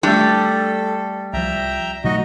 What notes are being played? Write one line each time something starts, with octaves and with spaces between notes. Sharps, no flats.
G3 A3 D4 A4
C2 F3 E5 G5 A#5
B2 F#3 A3 D#4 F#4 D#5